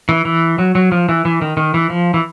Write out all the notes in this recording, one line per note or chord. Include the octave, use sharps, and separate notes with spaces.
E3
E3
F#3
F#3
F3
E3
E3
D#3
D#3
E3
F3
E3